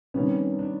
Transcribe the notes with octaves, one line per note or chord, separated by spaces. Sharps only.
C3 D#3 G3 B3 C#4
D4